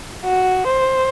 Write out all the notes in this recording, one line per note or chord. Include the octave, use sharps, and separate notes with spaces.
F#4
C5